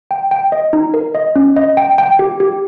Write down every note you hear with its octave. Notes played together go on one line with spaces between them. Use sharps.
G5
G5
D#5
D#4
A#4
D#5
C#4
D#5
G5
G5
G4
G4